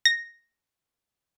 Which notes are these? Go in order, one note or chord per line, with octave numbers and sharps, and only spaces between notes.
A#6